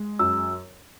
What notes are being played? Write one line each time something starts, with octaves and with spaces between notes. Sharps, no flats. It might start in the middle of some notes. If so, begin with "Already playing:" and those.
Already playing: G#3
F#2 E6